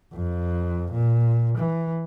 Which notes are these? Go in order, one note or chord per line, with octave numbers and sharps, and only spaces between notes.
F2
A#2
E3